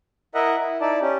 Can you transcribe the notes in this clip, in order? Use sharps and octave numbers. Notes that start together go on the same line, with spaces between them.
E4 A#4 D#5 E5 F#5
E4
D#4 E4 D5 A5
C#4 G4